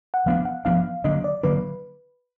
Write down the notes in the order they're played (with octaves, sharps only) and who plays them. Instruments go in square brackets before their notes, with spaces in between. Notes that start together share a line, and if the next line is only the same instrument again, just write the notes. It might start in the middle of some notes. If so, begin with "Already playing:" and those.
[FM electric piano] F#5
[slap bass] F3 B3 D4 [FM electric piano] F5
[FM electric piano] F#5
[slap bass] F3 B3 D4 [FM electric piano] F5
[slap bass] D3 F#3 A#3 D4 [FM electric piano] D#5
[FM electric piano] D5
[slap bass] D3 F#3 A#3 D4 [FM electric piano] B4